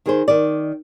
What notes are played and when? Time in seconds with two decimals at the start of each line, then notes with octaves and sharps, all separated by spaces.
0.06 D#3 G#4 C5
0.28 D#3 D5